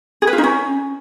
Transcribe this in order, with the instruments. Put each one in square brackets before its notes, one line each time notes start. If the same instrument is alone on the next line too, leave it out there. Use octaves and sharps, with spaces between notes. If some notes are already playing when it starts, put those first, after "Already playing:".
[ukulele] G#4
B4
F4
D#4
C#4